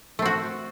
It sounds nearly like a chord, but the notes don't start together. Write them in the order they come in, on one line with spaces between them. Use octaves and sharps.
A3 C4 F#4